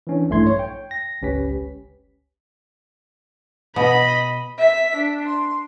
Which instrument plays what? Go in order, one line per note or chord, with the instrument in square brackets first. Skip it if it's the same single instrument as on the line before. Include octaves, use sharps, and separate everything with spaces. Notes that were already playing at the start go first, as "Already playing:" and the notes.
[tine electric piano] E3 C#4 D4
A#1 G2 A3 E4 C6 G#6
C#5
G5
A#6
G1 C#2 C#4 G4 B4 B6
[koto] B2 [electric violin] D#5 B5
[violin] E5 B6
D4
C6